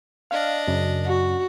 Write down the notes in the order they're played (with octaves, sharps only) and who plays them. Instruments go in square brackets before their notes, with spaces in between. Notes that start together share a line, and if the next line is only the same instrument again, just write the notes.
[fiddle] D4 D#5 [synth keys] F5
[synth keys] F#2 C#3
[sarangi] F#4